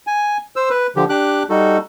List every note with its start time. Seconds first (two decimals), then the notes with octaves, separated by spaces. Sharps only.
0.07 G#5
0.56 C5 E6
0.70 B4
0.96 D3 F3 G4
1.10 D4 G4 D6 F#6
1.50 G3 D#4 F#4 A4